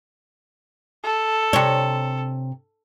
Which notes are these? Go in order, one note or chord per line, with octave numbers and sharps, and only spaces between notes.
A4
C3 C#5